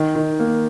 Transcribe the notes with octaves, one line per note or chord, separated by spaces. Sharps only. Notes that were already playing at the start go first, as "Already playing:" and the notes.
Already playing: D#3
D#3
A#3